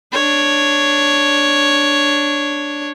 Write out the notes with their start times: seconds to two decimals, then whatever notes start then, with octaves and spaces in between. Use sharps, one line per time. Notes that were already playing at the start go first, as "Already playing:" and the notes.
0.12 D4 C#5